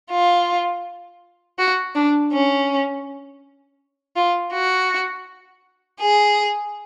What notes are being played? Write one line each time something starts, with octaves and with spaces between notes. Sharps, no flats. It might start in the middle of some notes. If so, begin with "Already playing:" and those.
F4
F#4
D4
C#4
F4
F#4
G#4